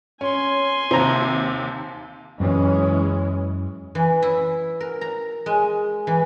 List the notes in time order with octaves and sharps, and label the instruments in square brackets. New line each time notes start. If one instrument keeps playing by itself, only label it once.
[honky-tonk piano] C#4 [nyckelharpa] G#5 C6
[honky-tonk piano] D#2 C3 [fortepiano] C5 A#5
[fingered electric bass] F#2 [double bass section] E3 G#3 C#4
[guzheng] E3
E4
A#4
A#5
G#3
E3